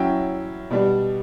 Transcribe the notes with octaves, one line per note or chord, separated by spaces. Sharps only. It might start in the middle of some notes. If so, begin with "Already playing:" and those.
Already playing: F#3 C#4 E4 G5
B2 G3 D4